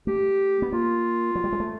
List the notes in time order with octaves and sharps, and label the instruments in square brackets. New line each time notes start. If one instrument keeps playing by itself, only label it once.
[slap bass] A3 [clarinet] G4
[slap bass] B3
[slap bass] A#3 [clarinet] F4
[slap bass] F#3
G3
G#3
A3